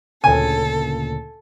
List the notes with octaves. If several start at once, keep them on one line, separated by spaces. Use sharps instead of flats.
D2 A#2 C#3 A4 G#5